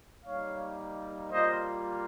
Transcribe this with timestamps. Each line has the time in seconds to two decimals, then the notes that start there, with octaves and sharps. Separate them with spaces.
0.24 G3 A#3 D#4 C#5 F5
1.31 G3 A#3 F4 C5 D#5